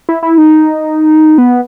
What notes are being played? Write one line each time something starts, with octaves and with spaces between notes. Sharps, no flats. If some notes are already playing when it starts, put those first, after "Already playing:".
E4
E4
D#4
B3